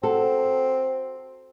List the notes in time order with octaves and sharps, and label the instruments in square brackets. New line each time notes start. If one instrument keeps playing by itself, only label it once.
[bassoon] C4 [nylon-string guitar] F#4 A4